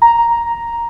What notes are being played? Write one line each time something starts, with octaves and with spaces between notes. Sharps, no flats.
A#5